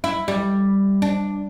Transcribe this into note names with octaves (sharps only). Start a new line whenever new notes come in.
E4
G3
D4